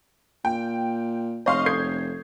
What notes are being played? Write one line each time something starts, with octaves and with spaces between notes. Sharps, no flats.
A#2 G5
F1 C#5 D#5 F5 C6 C#6
A4 G6 G#6 C7